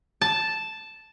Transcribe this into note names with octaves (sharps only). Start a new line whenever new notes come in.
A5